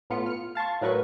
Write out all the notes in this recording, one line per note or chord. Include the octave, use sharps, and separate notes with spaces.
A2 B3 F4 C#7
F6 C#7
F5 A5 C6 C#6
A2 F#3 A#4 B4 C#6